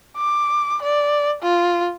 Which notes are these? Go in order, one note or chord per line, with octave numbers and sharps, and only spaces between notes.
D6
D5
F4